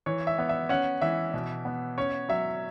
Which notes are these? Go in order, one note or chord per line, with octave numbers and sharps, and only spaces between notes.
E3 C#5
E5
B3
E5
C#4 F#5
E3 E5
B2
B3
C#4 C#5
F#3 E5